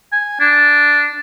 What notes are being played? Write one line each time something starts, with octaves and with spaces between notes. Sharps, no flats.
G#5
D4